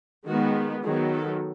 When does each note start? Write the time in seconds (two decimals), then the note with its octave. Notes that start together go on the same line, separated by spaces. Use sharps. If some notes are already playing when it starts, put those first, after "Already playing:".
0.26 D#3 G#3 B3 F#4
0.84 D#3 F#3 B3 G#4
1.13 A4